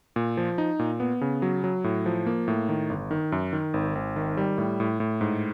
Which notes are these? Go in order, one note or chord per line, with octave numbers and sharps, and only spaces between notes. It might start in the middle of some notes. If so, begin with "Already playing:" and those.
A#2
F3
D#4
A#2
B3
C#3
F#3
F#3
A2
F3
A#3
A2
D#3
G1
D#3
F#2
D#3
G#1
G#1
D#3
G3
A2
A2
A2
G#2